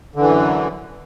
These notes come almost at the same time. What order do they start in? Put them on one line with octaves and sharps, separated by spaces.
D3 E3 F#2